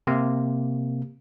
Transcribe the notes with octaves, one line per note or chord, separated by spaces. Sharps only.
C3 A#3